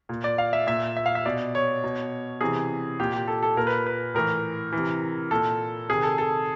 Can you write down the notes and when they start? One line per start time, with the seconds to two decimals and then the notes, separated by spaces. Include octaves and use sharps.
0.09 A#2
0.24 D5
0.38 F5
0.53 E5
0.67 A#2 E5
0.97 E5
1.06 F5
1.15 E5
1.26 B2 D5
1.55 C#5
1.84 B2
2.41 C3 E3 G#4
2.99 A#2 G4
3.13 G4
3.28 A4
3.43 A4
3.57 A#2 A#4
3.67 B4
3.86 B4
4.15 A2 E3 A#4
4.72 E3
4.78 C3
5.31 A#2 A4
5.89 C3 D#3 G#4
6.03 A4
6.18 A4